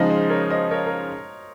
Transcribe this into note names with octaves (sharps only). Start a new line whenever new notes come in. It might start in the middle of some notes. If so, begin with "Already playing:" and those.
Already playing: C#3 F3 G#3 D#4 C5 D#5
C5 D#5
A#4 C#5
C5 D#5
A#4 C#5
A#4